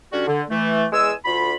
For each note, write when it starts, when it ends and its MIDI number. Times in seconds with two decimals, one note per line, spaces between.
0.13 0.26 50
0.13 0.26 55
0.13 0.26 61
0.13 0.26 66
0.28 0.43 50
0.50 0.86 52
0.50 0.86 57
0.93 1.12 40
0.93 1.12 56
0.93 1.12 80
0.93 1.12 88
1.25 1.55 38
1.25 1.55 50
1.25 1.55 65
1.25 1.55 83